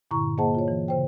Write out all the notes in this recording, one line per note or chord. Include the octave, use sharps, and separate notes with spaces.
G2 A#2 D3 E4 A#5 C#6
A#3 G#4 C5 D#5 F#5 A5
F4 C#5
E3
C#3 C5 G5